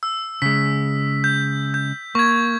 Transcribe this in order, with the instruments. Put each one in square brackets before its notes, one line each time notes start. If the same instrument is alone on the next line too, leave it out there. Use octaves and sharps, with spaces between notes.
[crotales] E6
[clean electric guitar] C#3 G#3 [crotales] B6
[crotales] G6
G6
[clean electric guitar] A#3 [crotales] C#6 G#6